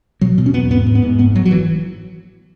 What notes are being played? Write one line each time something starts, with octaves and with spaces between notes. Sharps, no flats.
B2 F#3
B2
C#4
E2 B3
G#2 B3
G#2
B3
G#2
F#1 B3
F#1 F#3
F#3
E3